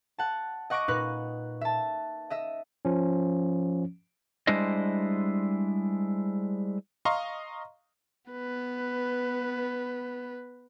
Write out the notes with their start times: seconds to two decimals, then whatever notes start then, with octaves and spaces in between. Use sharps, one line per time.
0.18 F#5 A5
0.70 D#5 F#5 C#6 D6 A#6 D7
0.88 A#2 D#4 B4 F#6
1.61 E5 A5
2.30 D#5 E5 E6
2.85 F3 C#4
4.47 G3 G#3 D4 E4 C5 D#5
7.05 D#5 F5 A#5 C6 C#6
8.31 B3 B4